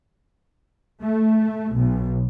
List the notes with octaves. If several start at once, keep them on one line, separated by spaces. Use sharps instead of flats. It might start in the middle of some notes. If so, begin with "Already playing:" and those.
A3
B1